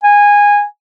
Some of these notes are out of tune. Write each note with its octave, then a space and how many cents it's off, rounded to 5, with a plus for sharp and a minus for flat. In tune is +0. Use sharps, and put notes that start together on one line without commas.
G#5 -15